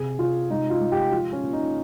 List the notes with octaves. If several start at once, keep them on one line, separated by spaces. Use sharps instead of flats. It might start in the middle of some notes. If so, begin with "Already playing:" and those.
Already playing: C3 G#4
C3 F4
G#3 D#4
F4
G#3
G4
F3 F4
C#4
A#2
D#4